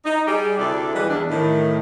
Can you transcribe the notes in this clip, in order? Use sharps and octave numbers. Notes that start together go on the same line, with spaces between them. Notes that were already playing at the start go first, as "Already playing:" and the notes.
D#4
G3 G4 G#4
D2 C3 D4 E4 A4 D5
E3 F3 G3 G#3 B4
E2 D4
A2 D#3